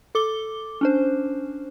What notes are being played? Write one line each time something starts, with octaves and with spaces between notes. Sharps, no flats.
A4 D6 G7
C#4 D4 C5